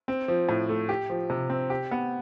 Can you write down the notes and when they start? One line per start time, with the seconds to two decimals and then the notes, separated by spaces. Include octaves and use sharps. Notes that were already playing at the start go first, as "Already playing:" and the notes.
0.08 C4
0.28 F3
0.49 A2
0.69 A3
0.89 G4
1.10 F3
1.30 C3
1.50 C4
1.70 G4
1.91 B3